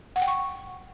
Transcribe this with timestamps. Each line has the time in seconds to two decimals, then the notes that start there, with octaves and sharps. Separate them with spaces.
0.16 F#5
0.22 G5
0.28 C#6